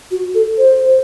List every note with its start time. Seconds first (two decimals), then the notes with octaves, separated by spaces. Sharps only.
0.11 F#4
0.34 A4
0.58 C5